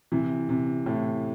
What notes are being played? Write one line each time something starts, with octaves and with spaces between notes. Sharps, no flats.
C3 E3
C3
A2